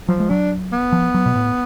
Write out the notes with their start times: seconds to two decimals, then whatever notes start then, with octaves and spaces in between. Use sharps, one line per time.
0.08 F3 F#3
0.20 G#3
0.30 F#3 D4
0.73 B3
0.92 F3
1.14 F#3
1.26 B2
1.35 A2